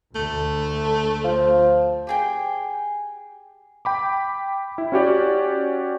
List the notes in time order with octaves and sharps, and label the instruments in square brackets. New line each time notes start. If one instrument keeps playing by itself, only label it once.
[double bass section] D2 D3 [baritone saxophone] A3
[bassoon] F3
[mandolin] G4 G#4 G5
[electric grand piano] G5 B5 D6
E4
C#4 F#4 G4 D5